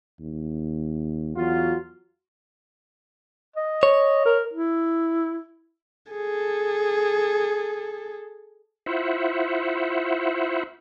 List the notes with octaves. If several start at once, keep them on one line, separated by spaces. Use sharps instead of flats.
D#2
E2 F#3 F4 F#4
D#5
C#5
A#4
E4
G#4 A4
E4 F4 C5 E5 F#5